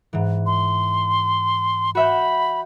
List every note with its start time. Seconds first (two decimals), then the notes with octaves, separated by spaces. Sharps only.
0.13 G#2 E3
0.46 C6
1.95 F#4 E5 B5 G6